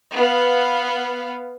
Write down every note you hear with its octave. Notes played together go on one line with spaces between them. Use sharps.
B3 F5